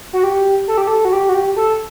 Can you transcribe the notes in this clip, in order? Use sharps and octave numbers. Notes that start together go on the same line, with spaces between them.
F#4
G4
A4
G4
A4
F#4
G4
F#4
G4
A4